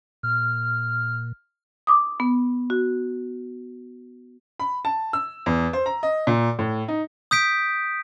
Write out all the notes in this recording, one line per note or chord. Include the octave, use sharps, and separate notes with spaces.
A#2 F6
D6 D#6
B3
F#4
B5
A5
E6
E2
C5
A#5
D#5
A#2
A2
D#4
D#6 G6 B6 D7